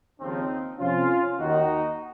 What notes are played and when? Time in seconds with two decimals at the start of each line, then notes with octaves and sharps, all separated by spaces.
0.19 D#2 C#3 F3 C4 D#4
0.79 F2 C3 F3 C#4 F4
1.39 D#2 D#3 D#4 F#4